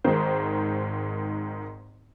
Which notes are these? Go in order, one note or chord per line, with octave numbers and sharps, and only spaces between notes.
G#1 G#2 D#3 C5